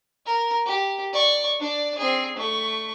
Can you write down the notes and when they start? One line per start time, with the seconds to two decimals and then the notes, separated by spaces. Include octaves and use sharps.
0.26 A#4
0.66 G4
1.13 D5 C#6
1.60 D4 D5
1.98 C4 G#4
2.36 A3 C#6